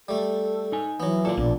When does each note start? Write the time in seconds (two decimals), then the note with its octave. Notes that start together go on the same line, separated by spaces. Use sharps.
0.08 G3 A3 A4
0.72 D#4 G#5
1.00 E3 F#3 B3
1.25 A#2 A4 D5
1.37 A#1 B2 D5